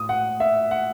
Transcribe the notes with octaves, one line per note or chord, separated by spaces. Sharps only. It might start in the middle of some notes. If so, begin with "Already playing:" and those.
Already playing: A2 D#6
F#5
E5
F#5